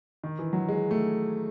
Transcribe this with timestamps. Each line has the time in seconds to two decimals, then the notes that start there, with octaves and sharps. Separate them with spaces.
0.24 D#3
0.39 E3
0.53 F#3
0.69 G#3
0.91 A3